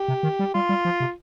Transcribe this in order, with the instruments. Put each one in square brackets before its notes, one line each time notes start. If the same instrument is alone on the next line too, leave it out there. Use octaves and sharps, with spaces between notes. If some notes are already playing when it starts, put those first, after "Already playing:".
Already playing: [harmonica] G4
[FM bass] C3
D#3
G3
[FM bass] G3 [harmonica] F4
[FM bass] G3
F3
C3